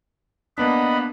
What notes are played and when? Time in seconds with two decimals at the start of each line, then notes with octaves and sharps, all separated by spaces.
0.58 A#3 B3 D4 D#5 F#5 B5